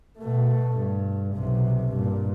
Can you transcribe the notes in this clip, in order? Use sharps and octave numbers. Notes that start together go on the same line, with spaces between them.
B2 A3
G2
B1 C3
G2 A#2